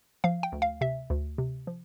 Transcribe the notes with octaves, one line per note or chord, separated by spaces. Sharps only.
F3 F5
G5
D2
F5
C3 E5
D2
C3
F3